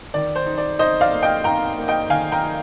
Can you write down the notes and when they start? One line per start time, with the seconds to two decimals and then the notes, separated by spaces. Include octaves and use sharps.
0.14 D#3 D5
0.36 C5
0.46 D#4
0.58 D5
0.79 D#4 C5 D#5
1.01 D5 F5
1.12 A#3
1.23 D#5 G5
1.44 D#4 G5 A#5
1.78 A#3
1.88 D#5 G5
2.10 D#3 F5 G#5
2.32 G5 A#5
2.43 D#4